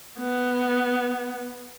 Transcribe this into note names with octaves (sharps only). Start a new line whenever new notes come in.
B3